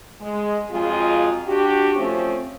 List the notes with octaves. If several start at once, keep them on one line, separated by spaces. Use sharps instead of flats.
G#3
F2 F#3 G#3 F4 G#4
D4 F#4 G4
F3 A3 C4 C#4